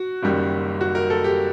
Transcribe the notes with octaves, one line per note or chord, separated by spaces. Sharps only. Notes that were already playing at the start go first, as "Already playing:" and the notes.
Already playing: F#4
F#1 F#2 D#3 G3
F#4
A#4
A4
G4